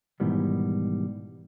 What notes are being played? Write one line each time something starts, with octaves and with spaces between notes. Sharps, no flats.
G#2 B2 D#3 E3 G3